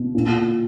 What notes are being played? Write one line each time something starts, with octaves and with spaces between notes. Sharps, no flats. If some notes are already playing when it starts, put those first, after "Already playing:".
Already playing: B2
A#2